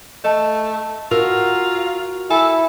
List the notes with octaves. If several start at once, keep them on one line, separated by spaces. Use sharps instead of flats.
A3 D#5 A5
F4 F#4 A#4 E6
E4 A4 G#5